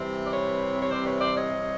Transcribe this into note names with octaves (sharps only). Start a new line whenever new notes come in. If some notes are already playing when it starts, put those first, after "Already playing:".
Already playing: C3 E3 G3 C4
D5
B4 C#5
C#5
C5 D5
B4 C#5
C5 D5
C#5 D#5